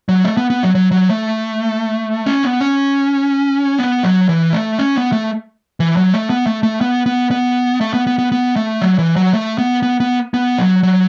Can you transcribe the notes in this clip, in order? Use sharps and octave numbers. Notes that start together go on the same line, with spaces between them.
F#3
A3
B3
B3
F#3
F#3
F#3
A3
C#4
B3
C#4
B3
F#3
E3
A3
C#4
B3
A3
E3
F#3
A3
B3
A3
A3
B3
B3
B3
A3
B3
B3
B3
B3
A3
F#3
E3
F#3
A3
B3
B3
B3
B3
F#3
F#3